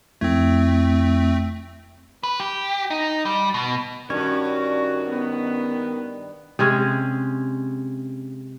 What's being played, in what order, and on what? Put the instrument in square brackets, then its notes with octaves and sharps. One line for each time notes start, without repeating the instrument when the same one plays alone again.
[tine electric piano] F2 E4 G#6 [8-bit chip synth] A3 C4
[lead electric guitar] B4
G4
D#4
G3
B2
[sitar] G2 [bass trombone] D#3 [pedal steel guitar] C#4 C#5 [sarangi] F#4
[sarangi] B3
[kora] C3 G#3 C#4 G#4